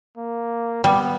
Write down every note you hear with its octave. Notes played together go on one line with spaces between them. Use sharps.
A#3
G3 B3